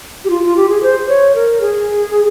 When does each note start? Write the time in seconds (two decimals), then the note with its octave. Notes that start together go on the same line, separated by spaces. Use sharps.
0.25 G4
0.30 F4
0.43 F4
0.57 G4
0.69 G#4
0.83 C5
1.09 C#5
1.35 A#4
1.61 G#4